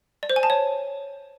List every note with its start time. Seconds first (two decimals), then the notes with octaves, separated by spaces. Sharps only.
0.23 D5
0.30 C5
0.36 G#5
0.43 A5
0.50 C#5